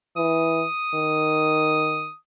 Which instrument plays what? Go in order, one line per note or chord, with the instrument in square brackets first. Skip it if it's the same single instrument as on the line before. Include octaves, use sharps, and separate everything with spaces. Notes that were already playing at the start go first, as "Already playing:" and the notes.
[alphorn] E3 [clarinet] D#6
[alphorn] D#3